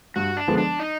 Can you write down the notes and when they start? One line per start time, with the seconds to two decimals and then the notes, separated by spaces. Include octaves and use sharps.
0.16 G2 F#4
0.37 D4
0.48 D3 F3 G#3 B3
0.58 D4
0.80 D#4